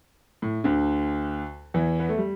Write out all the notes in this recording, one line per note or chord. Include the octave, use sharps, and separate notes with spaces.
A2
D2 D3
E2 E3
B3
A3
G3